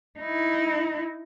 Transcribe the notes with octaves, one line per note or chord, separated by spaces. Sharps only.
D#4 E4